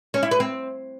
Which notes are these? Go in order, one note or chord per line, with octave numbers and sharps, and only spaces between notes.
C#4
E4
B4
C4